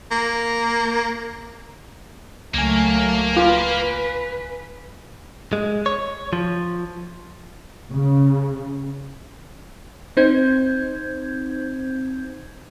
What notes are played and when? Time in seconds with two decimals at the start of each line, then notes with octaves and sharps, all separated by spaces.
0.11 A#3
2.54 C#2 F#3 A3 A#3 G#5
3.37 F4 B4
5.53 G#3
5.86 C#5
6.33 F3
7.93 C#3
10.17 C4 D#4 C5 G6 G#6